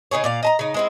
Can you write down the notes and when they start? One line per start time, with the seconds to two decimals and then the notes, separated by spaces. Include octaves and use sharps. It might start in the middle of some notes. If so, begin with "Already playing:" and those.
0.11 C#3 D#4 G#4 C#5
0.24 A#2 D5 F5
0.43 D#5 A5 A#5
0.59 C#3 D#4
0.74 G#3 C4 E4